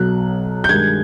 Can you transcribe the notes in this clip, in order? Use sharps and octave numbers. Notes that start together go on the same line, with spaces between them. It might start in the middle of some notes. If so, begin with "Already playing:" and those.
Already playing: B1 B2 F#3 F#6
G6
G2 D#3 G#3 G#6